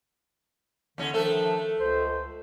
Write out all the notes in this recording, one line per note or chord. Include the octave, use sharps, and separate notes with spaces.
D#2 D3 C#4
D#3 F3 A3 D4 A4
C#2 C5